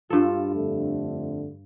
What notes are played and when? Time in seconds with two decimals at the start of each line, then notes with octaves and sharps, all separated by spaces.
0.10 G2 F4 A4
0.54 F2 D3 A3